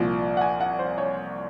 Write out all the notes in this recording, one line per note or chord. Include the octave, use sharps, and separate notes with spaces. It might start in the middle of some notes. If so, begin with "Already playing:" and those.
Already playing: C2 A#2 F3
F#5
G#5
F#5
C5
C#5